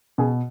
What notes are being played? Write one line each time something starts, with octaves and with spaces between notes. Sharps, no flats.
B2 G#4